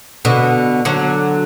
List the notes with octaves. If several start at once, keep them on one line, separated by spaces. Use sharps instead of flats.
B2 D3
D3 F#3